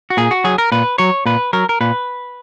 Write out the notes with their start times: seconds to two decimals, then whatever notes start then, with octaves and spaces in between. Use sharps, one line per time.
0.10 F#4
0.17 A#2 G#4
0.31 F#4
0.44 F#3 G#4
0.58 A#4
0.72 A#2 B4
0.98 F#3 C#5
1.26 A#2 B4
1.53 F#3 A#4
1.69 A#4
1.81 A#2 B4